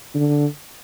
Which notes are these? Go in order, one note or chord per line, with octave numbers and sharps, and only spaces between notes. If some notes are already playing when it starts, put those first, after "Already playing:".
D3